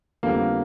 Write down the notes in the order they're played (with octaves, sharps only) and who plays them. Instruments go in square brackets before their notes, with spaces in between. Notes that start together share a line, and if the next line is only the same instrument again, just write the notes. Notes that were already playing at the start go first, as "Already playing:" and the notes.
[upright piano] F2 D3 G3 B3 [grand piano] A#3